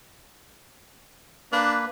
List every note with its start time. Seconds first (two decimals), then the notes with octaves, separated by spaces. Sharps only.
1.52 A#3 D4 B4